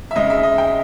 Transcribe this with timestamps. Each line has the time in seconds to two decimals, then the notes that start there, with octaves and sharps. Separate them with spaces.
0.11 E5
0.16 C#3 G#3 D#5
0.30 E5
0.43 D#5
0.58 G5